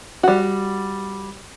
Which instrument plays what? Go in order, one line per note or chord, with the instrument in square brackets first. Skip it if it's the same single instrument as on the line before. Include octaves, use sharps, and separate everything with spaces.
[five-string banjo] G3 F#4